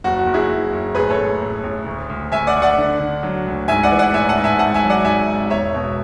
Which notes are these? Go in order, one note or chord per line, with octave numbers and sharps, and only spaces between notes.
F#1 F#4
F#4
F#1
E4 G#4
F#1
F#1
A1 G#4 B4
A4 C#5
A1
A1
A1
D2
D2
D2 E5 G#5
D5 F#5
D2
D5 F#5
D3
D3
F#3
D2
G#2 E5 G#5
D5 F#5
E3
D5 F#5
A1 E5 G#5
F#5 A5
G#2
E5 G#5
G#1 F#5 A5
E5 G#5
F#3
D5 F#5
G#2 E5 G#5
G#1
E1 C#5 E5
B2